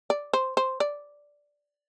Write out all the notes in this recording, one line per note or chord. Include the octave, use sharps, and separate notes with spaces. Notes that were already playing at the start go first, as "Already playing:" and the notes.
D5
C5
C5
D5